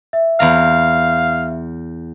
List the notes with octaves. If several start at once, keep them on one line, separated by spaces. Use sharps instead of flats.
E5
E2 F5 A#5